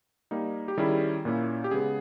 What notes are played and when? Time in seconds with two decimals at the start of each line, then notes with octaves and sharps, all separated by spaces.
0.31 G3 A#3 D#4
0.68 G4
0.78 D#3 G3 C#4 E4 G#4
1.25 A#2 A#3 C#4 E4
1.64 G4
1.71 C#3 G#3 B3 G#4